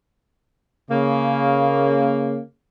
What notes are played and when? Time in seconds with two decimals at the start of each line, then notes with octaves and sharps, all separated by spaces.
0.91 C#3 A#3